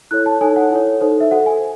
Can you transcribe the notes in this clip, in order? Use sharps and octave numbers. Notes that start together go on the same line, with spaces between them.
E4 A4 C#5 F#6
A5
D#4 A4 C#5 G#5
F#5
E4 A4 C#5
D#4 A4 C5
E5
F#4 A4 C5 F#5
G#5